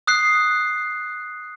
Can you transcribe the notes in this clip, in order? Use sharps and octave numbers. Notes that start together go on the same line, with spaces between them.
D#6 F#6 C7